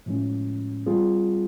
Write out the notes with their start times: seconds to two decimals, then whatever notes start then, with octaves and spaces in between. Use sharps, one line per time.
0.06 A2 F3 G#3 C#4
0.86 G3 C4 F4 G#4